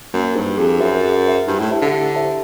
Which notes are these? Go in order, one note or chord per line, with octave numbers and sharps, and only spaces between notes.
F#2 A#3
G2 D#4 G4 C5
F2 G#4
F#2 C5 E5
G#4
C5 E5
G2 E4
A2
G4 C5 E5 A5
D3
E4
G4 C5 E5 A5